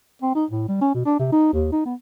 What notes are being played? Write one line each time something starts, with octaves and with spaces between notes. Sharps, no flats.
C4
D#4
A2
G3
C#4
B2
D4
C3
D#4
D#2
D#4
B3